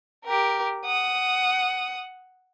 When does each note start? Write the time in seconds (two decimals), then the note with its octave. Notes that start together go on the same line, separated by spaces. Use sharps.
0.25 G4 A#4
0.86 F#5 D#6